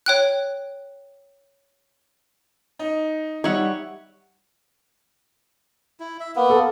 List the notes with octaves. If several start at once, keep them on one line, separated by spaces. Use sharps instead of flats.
C#5 G5 F#6
D#4
G3 D#4 C#5 E5 F#5
E4
E5
A#3 B3
A4